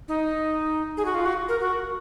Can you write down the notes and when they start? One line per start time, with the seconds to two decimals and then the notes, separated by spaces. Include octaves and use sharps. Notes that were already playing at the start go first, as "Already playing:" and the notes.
0.08 D#4
0.97 G#4
1.05 F#4
1.14 F4
1.25 F#4
1.48 A#4
1.60 F#4